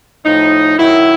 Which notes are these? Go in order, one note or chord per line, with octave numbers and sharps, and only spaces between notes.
A2 F3 D#4
F#2 D#3 F#3 E4